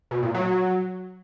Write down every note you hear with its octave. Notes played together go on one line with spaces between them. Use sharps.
B2
A#2
F#3